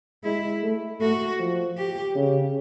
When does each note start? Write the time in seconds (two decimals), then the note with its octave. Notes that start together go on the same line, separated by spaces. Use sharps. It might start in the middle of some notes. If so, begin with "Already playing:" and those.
0.24 G#3 E4
0.62 A3
1.01 A3 F#4
1.39 F3
1.77 G4
2.15 C#3